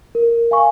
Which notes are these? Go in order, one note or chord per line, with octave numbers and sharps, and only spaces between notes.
A#4
F5 G#5 C#6